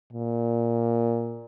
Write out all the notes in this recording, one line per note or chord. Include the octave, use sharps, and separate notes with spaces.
A#2